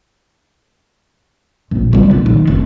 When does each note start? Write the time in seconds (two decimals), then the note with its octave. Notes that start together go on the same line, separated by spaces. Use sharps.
1.71 A#1
1.93 G3 B3
2.11 D#1
2.26 D#3
2.47 F1